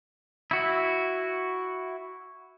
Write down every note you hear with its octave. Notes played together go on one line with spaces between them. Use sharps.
E4 F#4